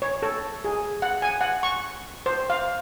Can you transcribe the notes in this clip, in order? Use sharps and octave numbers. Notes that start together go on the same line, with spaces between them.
C#5
A4
G#4
F#5
G#5
F#5
C#6
C5
F5